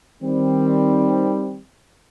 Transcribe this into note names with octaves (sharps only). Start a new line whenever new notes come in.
D#3 G3 C4